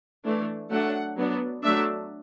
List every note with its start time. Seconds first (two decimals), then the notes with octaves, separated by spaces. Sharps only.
0.25 E3 A3 D4
0.71 F#3 A3 D4 F#5
1.17 F#3 B3 D4
1.63 F#3 A3 D4 E5